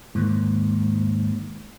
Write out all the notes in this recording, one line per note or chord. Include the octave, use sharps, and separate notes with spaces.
D#2 G#2